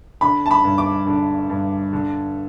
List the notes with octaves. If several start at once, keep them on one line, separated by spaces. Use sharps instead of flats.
D3 B5
A5
B5
G2
D6
D3
G2
D3